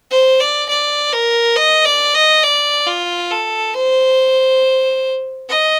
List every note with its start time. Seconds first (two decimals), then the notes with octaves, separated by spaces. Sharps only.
0.11 C5
0.40 D5
0.69 D5
1.13 A#4
1.56 D#5
1.85 D5
2.14 D#5
2.43 D5
2.86 F4
3.31 A4
3.74 C5
5.49 D#5